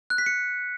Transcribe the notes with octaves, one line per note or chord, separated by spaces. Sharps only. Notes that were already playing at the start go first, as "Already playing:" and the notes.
F#6
B6
C#7